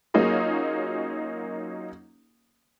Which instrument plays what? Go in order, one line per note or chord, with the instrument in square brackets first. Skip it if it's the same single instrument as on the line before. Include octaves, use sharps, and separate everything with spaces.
[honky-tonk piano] F#3 A#3 C#4 D#4 F4 G#4